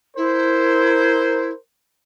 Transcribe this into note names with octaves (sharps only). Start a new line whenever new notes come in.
E4 A#4 C5